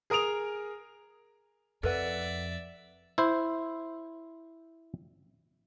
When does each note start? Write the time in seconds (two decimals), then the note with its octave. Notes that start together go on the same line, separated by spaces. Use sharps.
0.10 G#4 A#4 D#6 D7 F7
1.83 F2 A4 B4 D5 E5 F#5
3.18 E4 C5